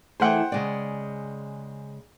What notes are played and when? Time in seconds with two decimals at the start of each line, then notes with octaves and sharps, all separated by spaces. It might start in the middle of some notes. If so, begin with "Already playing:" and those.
0.20 E3 A3 G#4 C5 F#5 G5
0.52 C#3 G#3 D5